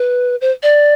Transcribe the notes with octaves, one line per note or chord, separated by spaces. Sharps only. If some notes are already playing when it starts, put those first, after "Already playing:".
Already playing: B4
C5
D5